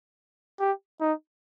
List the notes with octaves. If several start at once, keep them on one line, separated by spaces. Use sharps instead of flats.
G4
D#4